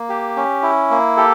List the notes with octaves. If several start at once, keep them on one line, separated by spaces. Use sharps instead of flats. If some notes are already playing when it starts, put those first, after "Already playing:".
Already playing: A#3
G4
C#4
E4
A#3
G4 A4